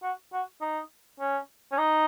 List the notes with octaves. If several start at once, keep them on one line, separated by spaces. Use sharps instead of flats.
F#4
F#4
D#4
C#4
C#4
D#4